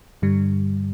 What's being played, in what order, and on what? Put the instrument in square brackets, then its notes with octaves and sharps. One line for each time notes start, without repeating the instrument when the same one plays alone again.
[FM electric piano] G2 D3 G3